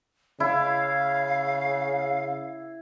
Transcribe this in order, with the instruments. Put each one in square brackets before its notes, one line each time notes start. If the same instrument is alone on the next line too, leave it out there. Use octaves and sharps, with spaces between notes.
[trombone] C#3 [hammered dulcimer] E4 [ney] F5